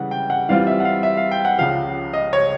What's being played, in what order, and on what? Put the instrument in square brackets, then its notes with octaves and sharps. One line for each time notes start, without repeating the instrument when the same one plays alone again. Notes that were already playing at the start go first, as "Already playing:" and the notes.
Already playing: [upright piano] C#3 E3 G3 [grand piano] F#5
[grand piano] G5
F#5
[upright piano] E3 G3 C4 F4 [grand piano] F5
[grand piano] E5
F#5
F5
E5
F5
G5
F#5
[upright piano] C#2 C#3 F3 [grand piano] F5
[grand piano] D#5
C#5